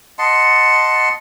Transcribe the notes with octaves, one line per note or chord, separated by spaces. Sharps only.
D#5 F#5 A5 C6